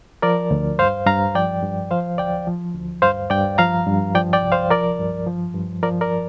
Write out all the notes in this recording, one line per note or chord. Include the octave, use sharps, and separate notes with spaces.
F3 A#4 D5
D2
G2 C5 F5
G2 F5 A#5
F3 D5 G5
G2
F3 C5 F5
D2 D5 G5
F3
D2
G2 C5 F5
G2 D5 G5
F3 F5 A#5
G2
F3 D5 G5
D5 G5
C2
C5 F5
F3 A#4 D5
G2
F3
G2
F3 A#4 D5
A#4 D5